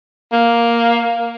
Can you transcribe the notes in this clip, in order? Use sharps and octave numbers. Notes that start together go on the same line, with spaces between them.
A#3